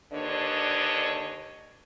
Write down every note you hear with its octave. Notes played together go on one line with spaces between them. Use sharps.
D#2 D3 D4 B4 C#5 D#5